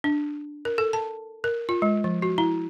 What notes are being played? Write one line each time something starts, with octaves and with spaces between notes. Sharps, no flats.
D4
A#4
A4
A5
A#4
F4
G#3
F3
F#4
E4